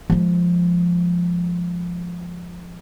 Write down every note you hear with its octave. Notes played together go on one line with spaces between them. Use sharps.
F3 G#3